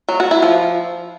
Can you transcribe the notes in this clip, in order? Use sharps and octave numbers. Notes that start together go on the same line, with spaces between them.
F#3
F#4
E4
F3